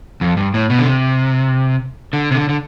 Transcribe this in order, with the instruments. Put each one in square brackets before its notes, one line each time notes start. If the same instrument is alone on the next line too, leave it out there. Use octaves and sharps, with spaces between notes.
[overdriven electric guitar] F2
G2
A2
B2
D3
C3
D3
C3
D3
D3